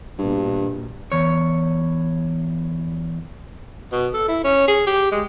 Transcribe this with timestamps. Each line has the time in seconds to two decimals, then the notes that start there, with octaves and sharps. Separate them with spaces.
0.18 A#1 G2 B2
1.12 E2 C#5
3.92 B2
4.14 A4
4.28 E4
4.44 C#4
4.68 G#4
4.87 G4
5.12 G#3